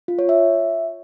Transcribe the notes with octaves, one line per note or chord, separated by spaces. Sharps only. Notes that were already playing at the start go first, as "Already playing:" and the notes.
F4
C#5
E5